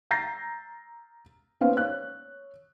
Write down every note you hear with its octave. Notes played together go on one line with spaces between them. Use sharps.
A#5 G6 A6 A#6 C7
A#3 B3 C#4 B4 C5 F5
C#5 F#6